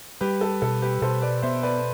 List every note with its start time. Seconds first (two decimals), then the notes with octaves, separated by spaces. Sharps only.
0.21 G3 G4 B4
0.41 A4
0.62 B2 A4
0.82 G4 B4
1.02 B2 A4 C5
1.22 B4 D5
1.42 B3 C5 E5
1.63 B4 D5